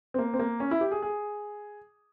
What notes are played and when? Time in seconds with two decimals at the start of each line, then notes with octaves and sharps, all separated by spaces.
0.14 C4
0.18 A#3
0.34 C4
0.39 A#3
0.60 C#4
0.71 E4
0.81 G4
0.92 G#4
1.02 G#4